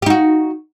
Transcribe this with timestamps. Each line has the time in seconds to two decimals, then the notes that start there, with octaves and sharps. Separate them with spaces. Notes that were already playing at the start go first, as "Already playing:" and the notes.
0.02 G4
0.06 D#4
0.10 F#4